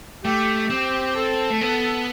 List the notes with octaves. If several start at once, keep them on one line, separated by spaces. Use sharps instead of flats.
A3 G4
C4
A4
A3
B3